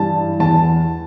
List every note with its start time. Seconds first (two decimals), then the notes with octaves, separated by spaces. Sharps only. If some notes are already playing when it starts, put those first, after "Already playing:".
Already playing: G2 E3 A5
0.39 E2 E3 A5